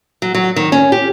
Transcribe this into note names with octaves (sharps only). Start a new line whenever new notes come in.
F#3
F#3
D#3
C#4
G4